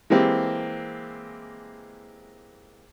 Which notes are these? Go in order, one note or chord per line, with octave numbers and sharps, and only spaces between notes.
E3 G#3 A#3 C4 G4